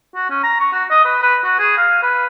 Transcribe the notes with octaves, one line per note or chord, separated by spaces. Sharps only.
F#4
C#4
A#5
C#6
F#4
D#5
B4
B4
F#4
G#4
F5
B4